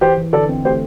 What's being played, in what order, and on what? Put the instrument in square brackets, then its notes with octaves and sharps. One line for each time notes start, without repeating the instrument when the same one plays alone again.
[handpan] E3 [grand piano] G4 C5
[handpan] E3
[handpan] D3 [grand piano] A4 D5
[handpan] C4
[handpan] A3 [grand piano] G4 C5